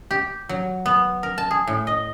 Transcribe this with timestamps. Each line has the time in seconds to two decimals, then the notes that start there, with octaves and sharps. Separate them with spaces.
0.11 G4
0.49 F#3
0.86 B3
1.23 A#4
1.38 A5
1.51 G#4
1.67 A2
1.87 D#5